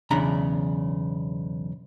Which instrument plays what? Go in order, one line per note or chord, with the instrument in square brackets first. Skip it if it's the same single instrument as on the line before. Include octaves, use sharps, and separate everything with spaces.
[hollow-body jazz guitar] B1 E2 C#3 D4 A#5 B5